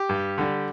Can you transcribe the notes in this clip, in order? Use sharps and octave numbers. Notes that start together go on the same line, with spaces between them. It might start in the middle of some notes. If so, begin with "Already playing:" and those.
Already playing: G4
G2
D3 G3